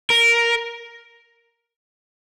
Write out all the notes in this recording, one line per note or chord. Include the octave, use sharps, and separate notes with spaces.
A#4